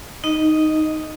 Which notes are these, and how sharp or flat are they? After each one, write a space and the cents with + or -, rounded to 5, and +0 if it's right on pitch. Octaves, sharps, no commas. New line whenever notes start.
D#4 +0 D#5 +0